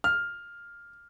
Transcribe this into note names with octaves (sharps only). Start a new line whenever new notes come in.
F6